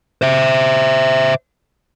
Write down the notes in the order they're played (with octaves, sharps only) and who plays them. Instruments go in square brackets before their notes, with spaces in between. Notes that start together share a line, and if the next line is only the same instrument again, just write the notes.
[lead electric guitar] C5 E5